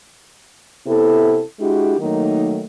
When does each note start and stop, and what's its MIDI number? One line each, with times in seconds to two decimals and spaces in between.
0.86 1.40 48
0.86 1.40 59
0.86 1.40 64
0.86 1.40 69
1.59 1.95 56
1.59 1.95 62
1.59 1.95 64
1.59 1.95 66
1.59 1.95 67
1.99 2.62 51
1.99 2.62 54
1.99 2.62 57
1.99 2.62 58
1.99 2.62 63